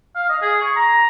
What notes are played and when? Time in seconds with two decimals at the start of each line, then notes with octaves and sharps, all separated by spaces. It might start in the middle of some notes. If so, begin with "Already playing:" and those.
0.15 F5
0.29 D#5
0.42 G#4
0.62 C#6
0.76 A#5